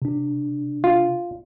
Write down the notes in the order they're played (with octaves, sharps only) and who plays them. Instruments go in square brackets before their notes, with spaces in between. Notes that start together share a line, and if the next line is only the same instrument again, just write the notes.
[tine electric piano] C3 D4
[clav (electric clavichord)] F4